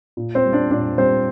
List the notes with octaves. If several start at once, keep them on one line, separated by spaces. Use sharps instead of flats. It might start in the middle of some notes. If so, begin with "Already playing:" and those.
A#2
C4 C5
G3
D4 D5
A#2 D4 D5
G3 C4 C5